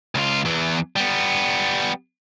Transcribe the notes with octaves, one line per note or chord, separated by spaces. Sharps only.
C#2 F4
E2 E3
G3 B3